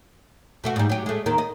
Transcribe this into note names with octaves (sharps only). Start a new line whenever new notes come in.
B2 A3 F#4
G#2 G3
F#3 G4
G#3 A3
D#2 D#3 A#3
D#5